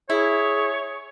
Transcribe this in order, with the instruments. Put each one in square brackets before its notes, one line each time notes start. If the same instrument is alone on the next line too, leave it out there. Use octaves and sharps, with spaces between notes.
[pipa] E4 [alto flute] G#4 [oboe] C#5